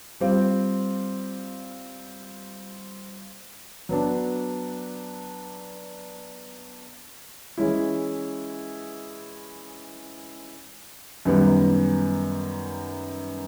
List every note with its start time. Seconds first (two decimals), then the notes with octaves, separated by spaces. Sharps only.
0.21 G3 C4 F4
3.89 F#3 B3 D4
7.58 E3 G#3 C#4 E4
11.25 F#2 D#3 G3 B3